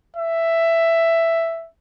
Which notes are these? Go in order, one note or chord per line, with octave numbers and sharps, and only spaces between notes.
E5